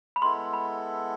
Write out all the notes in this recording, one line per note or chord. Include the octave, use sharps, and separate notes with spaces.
B5
G#3 B3 E4 A4 C6
B5